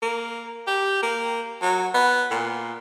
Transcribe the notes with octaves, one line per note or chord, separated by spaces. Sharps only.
A#3
G4
A#3
F#3
B3
A#2